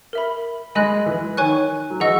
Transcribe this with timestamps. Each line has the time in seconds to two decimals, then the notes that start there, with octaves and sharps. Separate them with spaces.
0.13 A#4 E5 B5
0.75 G#3 D#5 G#5 B5 F#6
1.06 E3
1.37 D#3 C#5 G#5 C#6 F#6
1.90 F#3
2.00 E3 G#4 D#5 F#5 C#6 E6